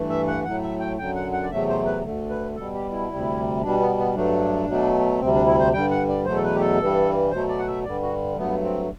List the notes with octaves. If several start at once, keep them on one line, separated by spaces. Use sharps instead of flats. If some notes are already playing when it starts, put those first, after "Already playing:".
Already playing: G2 E3 A3
E5
F#5
A2 F#3 A3 F#5
E5
G5
F#2 D3 F#3 G5
F#5
F#5
D5
E2 C3 F#3 A3 E5
C5
B4
D2 D3 A3
B4
B2 G3 A4
G4
E4
D2 C3 G3
B2 G3 D4
B3
B3
G2 F#3 A3 D4
B2 F#3 A3
D2 C3 G3 C4
D4
E4
C5
G2 D3 G3 G5
F#5
D5
E2 B2 F#3 A3 C5
A4
B4
G4
A4
G2 E3 G3
B2 F#3 A3 C5
D5
F#5
E5
G2 D3 G3 D5
F#4
G2 F#3 A3 B3
C4